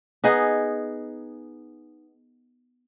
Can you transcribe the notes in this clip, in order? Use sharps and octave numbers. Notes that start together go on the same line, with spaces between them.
B3 D#4 G#4